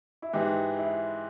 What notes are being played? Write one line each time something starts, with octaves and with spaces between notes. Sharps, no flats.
E4
G#2 E3 G#3 D#4 G4
E4